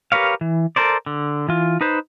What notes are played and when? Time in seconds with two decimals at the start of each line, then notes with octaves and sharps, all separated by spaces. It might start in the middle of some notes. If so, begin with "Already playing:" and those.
0.12 G4 A#4 B4 C#5 F5
0.41 E3
0.76 A4 A#4 C5 D5
1.06 D3
1.49 E3 F4
1.81 D#4 B4 C5